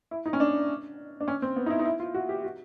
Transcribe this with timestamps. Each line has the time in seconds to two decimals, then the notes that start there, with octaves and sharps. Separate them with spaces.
0.11 E4
0.26 D#4
0.33 C#4
0.40 D4
1.20 D4
1.28 C#4
1.42 C4
1.56 B3
1.66 D#4
1.70 E4
1.79 D#4
1.85 E4
2.00 F4
2.14 F#4
2.29 G4
2.44 F#4